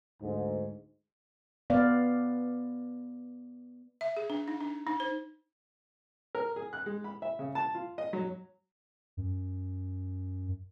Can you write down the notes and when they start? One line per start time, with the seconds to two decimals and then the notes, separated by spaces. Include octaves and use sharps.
0.21 D2 G#2
1.70 B3 B4 D5 F5
4.01 E5
4.17 G#4
4.30 D4
4.48 D#4
4.60 D4
4.87 D#4
5.00 C5
6.35 A#4
6.56 G#4
6.73 F#6
6.86 G#3
7.04 B5
7.22 E5
7.39 C#3
7.55 A5
7.75 F4
7.98 D#5
8.13 F#3
9.17 F#2